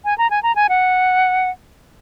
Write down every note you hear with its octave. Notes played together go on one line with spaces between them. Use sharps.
G#5
A#5
G#5
A#5
G#5
F#5